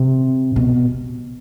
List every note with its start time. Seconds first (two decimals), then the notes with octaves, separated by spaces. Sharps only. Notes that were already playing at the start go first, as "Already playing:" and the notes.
Already playing: C3
0.56 B2